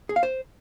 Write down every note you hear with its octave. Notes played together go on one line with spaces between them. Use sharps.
G#4
F5
C5